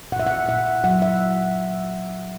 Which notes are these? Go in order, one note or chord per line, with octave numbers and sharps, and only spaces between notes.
A#2 F#5
E5
F#5
A#2 E5
F#3 F#5
E5